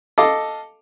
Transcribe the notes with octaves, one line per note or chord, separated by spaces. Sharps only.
A4 D#5 F5 D6